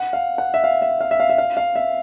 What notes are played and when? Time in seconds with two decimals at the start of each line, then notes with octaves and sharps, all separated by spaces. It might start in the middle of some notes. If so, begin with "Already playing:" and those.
Already playing: F#5
0.13 F5
0.38 F#5
0.54 E5
0.64 F5
0.82 E5
1.00 F5
1.11 E5
1.20 F5
1.29 E5
1.38 F5
1.57 F5
1.75 E5